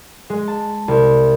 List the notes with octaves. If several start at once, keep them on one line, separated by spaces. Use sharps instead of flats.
G#3
A5
C2